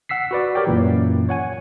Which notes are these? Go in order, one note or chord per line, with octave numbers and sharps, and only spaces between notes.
F#5 E6 B6 C7
F#4 B4 D5
G4 A#4 C#5 D5 G5
F#2 A#2 E3
C#5 F#5 G#5